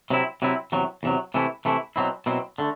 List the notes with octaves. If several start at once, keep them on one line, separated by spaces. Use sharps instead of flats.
C3 F#3 C4 E4
C3 F#3 C4 E4
E2 C3 F#3
E2 C3 F#3
C3 E3 A3 E4
C3 E3 A3 E4
B2 F#3 C4 E4
B2 F#3 C4 E4
D3 A3